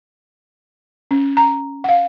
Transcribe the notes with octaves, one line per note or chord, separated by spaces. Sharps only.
C#4
A#5
F5 F#5